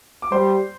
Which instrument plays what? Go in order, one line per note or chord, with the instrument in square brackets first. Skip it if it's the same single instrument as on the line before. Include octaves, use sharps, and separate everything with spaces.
[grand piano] D6
[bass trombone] G3 [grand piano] C5 C6